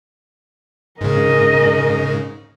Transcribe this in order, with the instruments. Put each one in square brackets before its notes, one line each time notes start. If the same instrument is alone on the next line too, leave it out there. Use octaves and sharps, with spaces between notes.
[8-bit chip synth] G#2 C#3 [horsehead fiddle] A#4 D#5